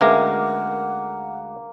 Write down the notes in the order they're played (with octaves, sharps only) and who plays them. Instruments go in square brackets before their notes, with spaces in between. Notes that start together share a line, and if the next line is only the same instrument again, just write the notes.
[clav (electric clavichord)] D2 G#3 A#5 [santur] A#3 [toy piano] C#4 B4 E5 [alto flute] F#5